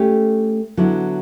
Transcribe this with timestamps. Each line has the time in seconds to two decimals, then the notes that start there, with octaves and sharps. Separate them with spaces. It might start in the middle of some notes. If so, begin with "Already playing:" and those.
Already playing: A3 C#4 G4
0.77 D3 F#3 B3 E4